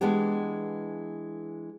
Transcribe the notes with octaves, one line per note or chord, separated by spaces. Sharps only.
E3 G#3 B3 D4 G4